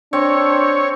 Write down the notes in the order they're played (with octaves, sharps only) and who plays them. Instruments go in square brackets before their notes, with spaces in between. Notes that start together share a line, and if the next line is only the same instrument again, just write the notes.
[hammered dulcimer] C4 [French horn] D4 [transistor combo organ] C#5